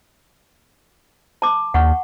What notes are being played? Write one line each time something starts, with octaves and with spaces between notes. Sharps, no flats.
A5 D6
D#2 F#5 C#6